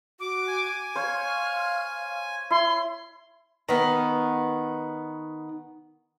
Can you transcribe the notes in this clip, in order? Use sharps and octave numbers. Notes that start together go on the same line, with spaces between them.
F#4 D6
G#5
C5 C#5 F5 F6
E4 C6
D#3 B3